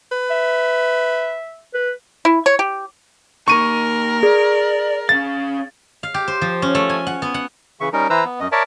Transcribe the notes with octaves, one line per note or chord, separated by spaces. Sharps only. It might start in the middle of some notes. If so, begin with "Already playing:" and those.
B4
E5
B4
E4
C#5
G4
A#3 D#4 A#4 C#6 D#7
G#4 D5
C#4 F5 A6
F5
G4
C5
F3
C#4
A3
G#5
F#5
B3
F#5
C#3 E3 E5 C#6
G3 C#4 D#4 A#4
E3 E4 B4 C5 A#5 E6
B3
F#2 D#5
A#4 C#5 D5 E5 A5